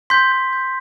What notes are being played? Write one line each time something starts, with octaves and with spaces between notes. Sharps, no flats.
C6 G6 B6
G6
G6